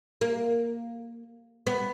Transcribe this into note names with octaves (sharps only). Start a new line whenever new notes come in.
A#3
B3